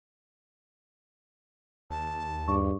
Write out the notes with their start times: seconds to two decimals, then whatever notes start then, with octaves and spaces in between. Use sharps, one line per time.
1.90 D#2 A5
2.48 G2 G#4 C#6